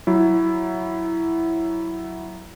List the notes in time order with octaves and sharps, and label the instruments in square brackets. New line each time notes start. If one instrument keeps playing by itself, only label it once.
[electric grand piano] F#3 E4